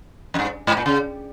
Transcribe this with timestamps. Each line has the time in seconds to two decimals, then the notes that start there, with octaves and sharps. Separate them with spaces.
0.34 F2
0.39 G2
0.67 G#2
0.77 A#2
0.86 C#3